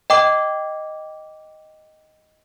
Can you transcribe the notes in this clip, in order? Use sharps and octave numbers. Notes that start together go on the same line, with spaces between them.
D#5 G5 D6